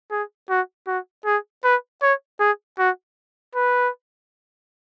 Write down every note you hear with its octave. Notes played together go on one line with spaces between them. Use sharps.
G#4
F#4
F#4
G#4
B4
C#5
G#4
F#4
B4